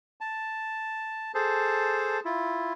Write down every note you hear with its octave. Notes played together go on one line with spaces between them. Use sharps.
A5
G#4 A4 C5 A5
E4 F4